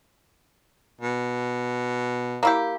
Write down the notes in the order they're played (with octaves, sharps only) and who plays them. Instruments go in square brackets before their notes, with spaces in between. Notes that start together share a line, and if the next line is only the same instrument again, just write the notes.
[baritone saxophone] B2
[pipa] A#3 E4 G4